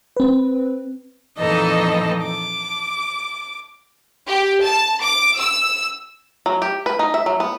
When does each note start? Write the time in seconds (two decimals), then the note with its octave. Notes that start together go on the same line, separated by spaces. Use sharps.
0.17 C4 B4
1.39 F2 A#2 E3 D#4 A4 D#5
2.24 D6
4.29 G4
4.63 A5
5.02 D6
5.38 E6
6.46 F#3
6.62 G4
6.86 B4
6.99 D#4
7.14 E5
7.26 F#3
7.40 B3